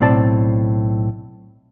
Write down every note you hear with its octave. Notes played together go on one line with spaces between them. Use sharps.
B1 A2 C4 D5 A5